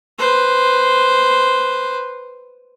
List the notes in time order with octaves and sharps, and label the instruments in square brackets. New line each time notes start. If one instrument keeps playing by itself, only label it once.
[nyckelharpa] B4 C5